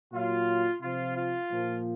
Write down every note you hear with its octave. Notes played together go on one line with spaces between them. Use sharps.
A#2 F#3 F4
C3 F3 F4
F4
A#2 F3